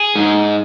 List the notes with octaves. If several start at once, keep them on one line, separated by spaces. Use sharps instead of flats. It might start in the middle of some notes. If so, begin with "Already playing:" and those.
Already playing: G#4
G#2